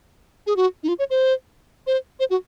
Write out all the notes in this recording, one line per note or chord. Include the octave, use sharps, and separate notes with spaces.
G#4
F#4
D#4
F4
C#5
C5
C5
C5
F#4